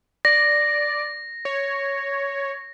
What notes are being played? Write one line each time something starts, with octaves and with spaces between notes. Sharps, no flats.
D5 A#6
C#5